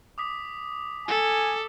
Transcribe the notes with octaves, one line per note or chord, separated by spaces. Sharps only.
D6 D#6 B6
A4 G#5